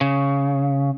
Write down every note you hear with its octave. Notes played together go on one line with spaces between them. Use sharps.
C#3